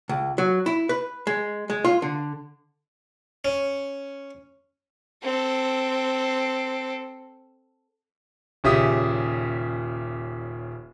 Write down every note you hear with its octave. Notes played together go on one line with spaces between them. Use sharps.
C#2
F#3
E4
B4
G#3
G#3
F4
D3
C#4
C4 A4
D#1 C#3 G4 E5 D#6